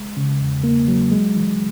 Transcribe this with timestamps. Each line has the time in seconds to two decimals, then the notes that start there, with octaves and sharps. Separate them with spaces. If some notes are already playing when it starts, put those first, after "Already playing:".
Already playing: G#3
0.17 C#3
0.41 E2
0.64 A#3
0.88 F#3
1.12 G#3
1.36 E3